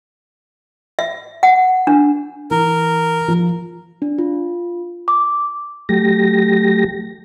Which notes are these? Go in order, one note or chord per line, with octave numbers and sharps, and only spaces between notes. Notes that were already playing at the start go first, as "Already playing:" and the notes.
E5
F#5
D4
E3 A#4
F3
D4
F4
D6
F#3 A3 G4 A#6